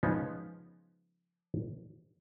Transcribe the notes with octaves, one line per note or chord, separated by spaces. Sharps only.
C#3 F3 G#3 B3 C#4 D#4